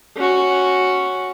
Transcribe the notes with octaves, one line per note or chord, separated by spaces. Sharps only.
C#4 F#4